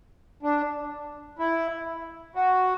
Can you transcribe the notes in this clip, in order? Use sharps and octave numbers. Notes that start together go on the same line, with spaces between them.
D4
E4
F#4